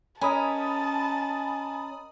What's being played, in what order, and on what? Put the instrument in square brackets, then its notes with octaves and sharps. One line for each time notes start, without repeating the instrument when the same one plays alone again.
[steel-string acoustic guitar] C#4 [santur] A#4 D#5 [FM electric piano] G#5 B5 D#6 [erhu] A5